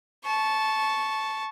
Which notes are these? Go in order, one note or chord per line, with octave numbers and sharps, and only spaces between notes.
A5 C#6